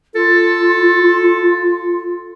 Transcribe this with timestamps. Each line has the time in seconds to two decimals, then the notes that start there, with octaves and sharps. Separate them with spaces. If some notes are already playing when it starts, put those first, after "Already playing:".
0.15 F4 A4